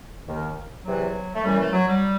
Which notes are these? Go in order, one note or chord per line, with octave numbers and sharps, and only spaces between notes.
D#2 D#3
E2 C3 E3 F#3
A3
F#2 E3 G3
A3
F#3
G3